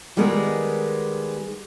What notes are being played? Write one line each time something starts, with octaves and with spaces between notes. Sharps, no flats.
D#3 G3 G#3 B3 G#4 A#4